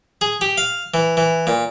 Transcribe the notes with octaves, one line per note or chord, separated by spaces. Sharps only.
G#4
G4
F5
E3
E3
A#2